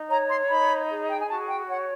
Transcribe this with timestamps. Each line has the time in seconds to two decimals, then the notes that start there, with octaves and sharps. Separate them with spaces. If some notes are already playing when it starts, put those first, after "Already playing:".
Already playing: D#4
0.09 C#5 A#5
0.30 C6
0.49 D#4 B5
0.90 G#4
1.08 G5
1.19 G#5
1.29 F#4 A5
1.49 G5
1.69 C#5 F#5